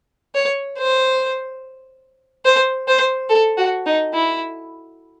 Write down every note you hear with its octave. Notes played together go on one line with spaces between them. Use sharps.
C#5
C5
C5
C5
A4
F#4
D#4
E4